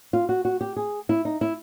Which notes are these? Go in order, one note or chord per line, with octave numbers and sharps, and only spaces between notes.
F4
F#4
F#4
G4
G#4
E4
D#4
E4